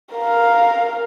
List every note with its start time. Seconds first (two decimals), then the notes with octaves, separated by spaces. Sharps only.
0.13 A#4 F5